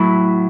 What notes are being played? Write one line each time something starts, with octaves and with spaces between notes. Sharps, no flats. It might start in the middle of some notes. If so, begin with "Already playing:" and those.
Already playing: A2 F#3 A3 E4